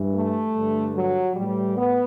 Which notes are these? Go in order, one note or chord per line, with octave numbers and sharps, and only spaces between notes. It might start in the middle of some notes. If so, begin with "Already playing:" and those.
Already playing: G2 E3
A3
G2 D3
F#3
A2 E3 G3
B3